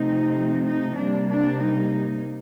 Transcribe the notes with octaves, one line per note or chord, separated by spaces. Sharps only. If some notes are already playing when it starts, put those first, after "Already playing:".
Already playing: C3 F3 A3 C4 D#4
D#4
C3 G3 A#3 D4
D4
D#4